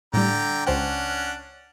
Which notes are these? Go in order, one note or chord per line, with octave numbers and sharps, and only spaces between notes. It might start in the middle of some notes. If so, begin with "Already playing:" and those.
A2 D3 G3 G5 A#5
C#2 C#4 D4 C5 F#5 G5